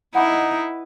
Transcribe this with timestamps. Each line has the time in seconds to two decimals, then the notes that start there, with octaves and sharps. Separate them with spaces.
0.15 D#4 E4 B4 D#5 F#5 G#5 D6